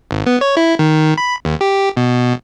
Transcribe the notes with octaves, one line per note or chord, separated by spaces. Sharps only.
G#1
B3
C#5
E4
D#3
B5
D#2
G4
B2